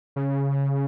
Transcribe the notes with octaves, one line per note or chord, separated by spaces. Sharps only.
C#3